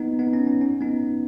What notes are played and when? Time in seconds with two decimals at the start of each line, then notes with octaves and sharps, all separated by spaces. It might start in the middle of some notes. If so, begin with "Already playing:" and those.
Already playing: B3 D#4
0.19 B3 D#4
0.33 C#4
0.47 C#4
0.61 C#4
0.81 B3 D#4